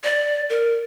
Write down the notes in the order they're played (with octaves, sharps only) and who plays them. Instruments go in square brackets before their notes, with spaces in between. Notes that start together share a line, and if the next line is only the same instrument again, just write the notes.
[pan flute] D5
A#4